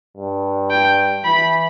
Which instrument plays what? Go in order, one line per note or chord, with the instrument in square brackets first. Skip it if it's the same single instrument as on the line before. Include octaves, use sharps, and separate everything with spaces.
[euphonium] G2
[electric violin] G5
[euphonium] E3 [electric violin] B5